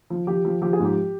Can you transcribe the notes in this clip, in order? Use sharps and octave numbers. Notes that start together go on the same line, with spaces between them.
F3
F3 G4
F3
F3 G4
G#4
G#2
G4